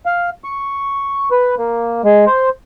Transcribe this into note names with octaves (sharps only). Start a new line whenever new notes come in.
F5
C#6
B4
A#3
G#3
C5